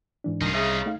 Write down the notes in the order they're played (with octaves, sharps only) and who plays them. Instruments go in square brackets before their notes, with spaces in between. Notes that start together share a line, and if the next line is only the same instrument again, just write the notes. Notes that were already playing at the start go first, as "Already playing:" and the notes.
[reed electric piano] G#2 E3 D4
[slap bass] C2 C3 [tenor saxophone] D#3 [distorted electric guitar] D#4 F4
[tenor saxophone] C#3 [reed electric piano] G#4 E5 D#6
[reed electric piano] A3 D#4 F5